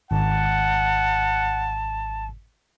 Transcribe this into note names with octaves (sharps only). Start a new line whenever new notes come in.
G#1 F#5 A5